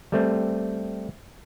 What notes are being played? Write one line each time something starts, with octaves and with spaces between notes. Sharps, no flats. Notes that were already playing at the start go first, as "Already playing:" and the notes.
G3 A3 C4